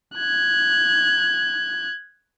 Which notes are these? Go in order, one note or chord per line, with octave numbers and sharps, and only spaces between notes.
F#6 G#6